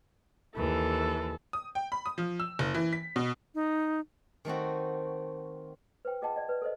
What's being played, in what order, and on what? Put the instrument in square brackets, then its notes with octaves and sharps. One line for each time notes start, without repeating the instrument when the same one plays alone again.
[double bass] D#2 [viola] E3 [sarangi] A4
[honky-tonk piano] D#6
G5
B5
D#6
F3
E6
F#1
E3
B6
B2
[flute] D#4
[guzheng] D#3 A3 C4 F#4
[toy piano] B4 C5 G5
F4 G#4 D#5 F#5 G5 A5
D5 D#5
B4 D5
A4 C5 D#5